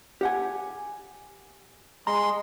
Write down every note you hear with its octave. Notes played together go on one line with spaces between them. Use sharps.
G4 F#5 G#5
G#3 A#5 C6